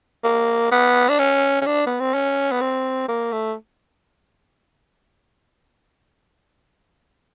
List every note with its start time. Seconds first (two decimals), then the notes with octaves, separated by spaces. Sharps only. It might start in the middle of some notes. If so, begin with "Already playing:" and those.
0.24 A#3
0.71 B3
1.09 D4
1.19 C#4
1.61 C#4
1.66 D4
1.86 B3
2.00 C4
2.14 C#4
2.52 B3
2.61 C4
3.08 A#3
3.32 A3